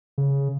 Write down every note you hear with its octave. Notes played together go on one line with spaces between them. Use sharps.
C#3